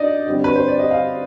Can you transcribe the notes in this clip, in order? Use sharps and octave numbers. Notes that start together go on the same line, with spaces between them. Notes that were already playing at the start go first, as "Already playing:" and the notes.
Already playing: G2 D4 D#4 D5 D#5
G2 D3 G3 C4
B4
C5
D5
D#5
F5